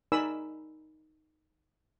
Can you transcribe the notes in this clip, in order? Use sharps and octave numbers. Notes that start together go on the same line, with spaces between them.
D#4 A#4 D5 G#5 B5 E6